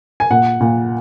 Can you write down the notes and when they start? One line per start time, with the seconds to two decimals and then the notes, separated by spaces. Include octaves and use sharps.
0.20 G#5
0.31 A#2 F#5
0.60 A#2